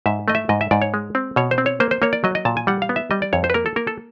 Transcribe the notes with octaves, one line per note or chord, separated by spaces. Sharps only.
G#2 E5
A3 D#5
E5
G#2 D#5
E5
G#2 D5
C#5
G#3
C4
B2 C#5
C5
C4
C#5
A#3 C5
C5
A#3 C#5
D5
F#3 D#5
D#5
A#2 A5
G#5
G3 F#5
F5
B3
E5
G3 D#5
D5
F2 C#5
C5
B4
A#3 A#4
A4
A#3 A#4
A4